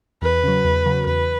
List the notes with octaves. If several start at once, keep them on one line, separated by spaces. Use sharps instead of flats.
E2 B4
C#3 F#3
E2
C#3 F#3
E2 B4